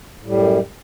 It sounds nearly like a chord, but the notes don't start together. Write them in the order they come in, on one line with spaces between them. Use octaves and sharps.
A2 G3 F#2